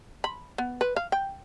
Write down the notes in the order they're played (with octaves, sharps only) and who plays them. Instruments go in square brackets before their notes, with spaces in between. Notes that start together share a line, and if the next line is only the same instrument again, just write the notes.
[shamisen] B5
B3
B4
F5
G5